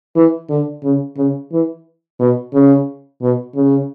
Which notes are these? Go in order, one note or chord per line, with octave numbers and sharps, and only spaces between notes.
E3
D3
C#3
C#3
E3
B2
C#3
B2
C#3